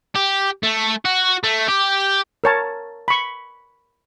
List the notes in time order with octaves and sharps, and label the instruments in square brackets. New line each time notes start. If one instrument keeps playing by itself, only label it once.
[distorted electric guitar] G4
A3
F#4
A3
G4
[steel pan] A#4 C#5 A5
B5 C#6